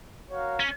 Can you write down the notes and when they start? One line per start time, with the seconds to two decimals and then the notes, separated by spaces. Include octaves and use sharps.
0.29 F#4 A#4 C#5 F5
0.60 C#4